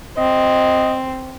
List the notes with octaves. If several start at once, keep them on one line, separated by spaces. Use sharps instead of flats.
C4 D#5